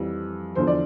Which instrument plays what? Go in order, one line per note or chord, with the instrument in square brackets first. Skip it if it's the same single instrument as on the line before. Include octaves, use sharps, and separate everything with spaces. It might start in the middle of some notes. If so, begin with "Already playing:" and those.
Already playing: [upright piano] F2 E3 G3
E2 D3 F3 C5
D5